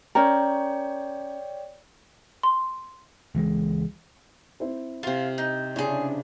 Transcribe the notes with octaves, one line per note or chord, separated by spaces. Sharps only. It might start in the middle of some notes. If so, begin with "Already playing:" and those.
C#4 A#4 C#5 D5 G5
C6
C#2 E3 G#3
C4 E4 C5
C3 F4 F5
D#4
C#3 D4 E4 G#4 C5 C#5